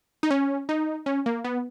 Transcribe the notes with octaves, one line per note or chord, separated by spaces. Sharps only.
D#4
C#4
D#4
C#4
A#3
B3